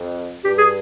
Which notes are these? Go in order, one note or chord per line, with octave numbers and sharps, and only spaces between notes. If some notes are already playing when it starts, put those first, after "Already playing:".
Already playing: F2
G2 G4
G#4